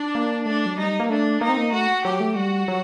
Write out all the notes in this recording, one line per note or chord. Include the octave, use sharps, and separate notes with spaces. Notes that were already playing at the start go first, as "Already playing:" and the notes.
Already playing: D4
A#3
A3 D4
F#3
G3 D#4
A#3
A3 D4
A#3 D#4
C4
A#3
A3 F#4
F#3 G4
A3
G3 F#4
F#3